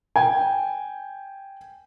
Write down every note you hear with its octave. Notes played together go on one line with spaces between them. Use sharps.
G5 G#5